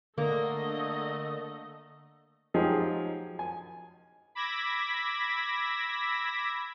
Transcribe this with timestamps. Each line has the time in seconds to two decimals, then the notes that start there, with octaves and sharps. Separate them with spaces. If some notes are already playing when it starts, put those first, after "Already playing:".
0.18 D3 A3 A#3 D#5
2.54 F3 F#3 D#4 G4 G#4
3.39 G#5
4.35 B5 D6 E6 G#6 A#6 B6